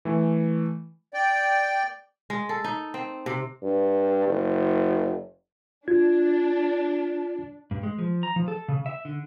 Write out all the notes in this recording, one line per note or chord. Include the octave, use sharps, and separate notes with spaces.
E3 A3 G#5
D5 G5
G#3
A4
D#4
C4
C3
G2
F#1
D4 F4 G#6
G2
G#3
F3
A#5
F3
A4
C#3
E5
D3